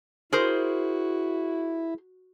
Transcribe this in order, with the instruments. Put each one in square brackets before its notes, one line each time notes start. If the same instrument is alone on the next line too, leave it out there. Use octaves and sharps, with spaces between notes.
[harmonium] E4 [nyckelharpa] F#4 [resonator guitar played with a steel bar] G#4 A#4 C5